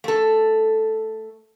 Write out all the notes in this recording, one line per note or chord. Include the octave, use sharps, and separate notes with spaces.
A3 A4